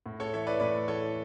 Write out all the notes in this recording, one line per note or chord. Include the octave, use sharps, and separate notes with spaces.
A2
A4 C#5
E3 C#5 E5
B4 D5
A2 B4 D5
E3 A4 C#5